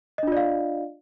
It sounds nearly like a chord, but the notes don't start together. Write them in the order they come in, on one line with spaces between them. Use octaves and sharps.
D#5 D4 F4 D5 F5